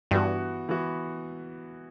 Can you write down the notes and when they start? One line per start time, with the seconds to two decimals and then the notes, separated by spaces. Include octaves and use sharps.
0.11 G2 E3 B3 F#4
0.69 E3 B3 F#4